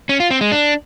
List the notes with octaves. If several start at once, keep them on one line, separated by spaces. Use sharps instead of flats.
C#4
F4
C4
G#3
D4